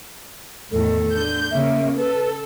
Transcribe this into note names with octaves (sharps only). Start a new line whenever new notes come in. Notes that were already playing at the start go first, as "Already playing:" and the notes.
E2 A2 D#3 A4
D3 G6
C#3 A#3 E5
A4 B4